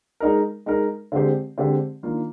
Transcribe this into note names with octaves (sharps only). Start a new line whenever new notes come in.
G#3 D#4 A#4
G#3 D#4 A#4
D3 G#3 C4 G4 C5
D3 G#3 C4 G4 C5
D#3 A#3 D4 F4